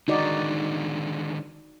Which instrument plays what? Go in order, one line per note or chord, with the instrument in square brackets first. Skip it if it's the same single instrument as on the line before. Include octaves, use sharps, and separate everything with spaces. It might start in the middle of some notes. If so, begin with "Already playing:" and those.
[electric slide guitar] D3 D#3 G#3 [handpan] D#4 F#4 D5